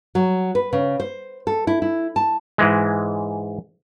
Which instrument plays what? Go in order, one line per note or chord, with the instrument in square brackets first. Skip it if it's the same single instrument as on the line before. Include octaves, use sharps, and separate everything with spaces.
[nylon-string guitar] F#3
B4
C#3
C5
A4
E4
E4
A5
[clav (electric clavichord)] G#2 E3 G#3